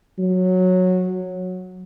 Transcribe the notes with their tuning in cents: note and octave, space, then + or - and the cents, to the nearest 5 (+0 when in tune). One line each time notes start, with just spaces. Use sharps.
F#3 -10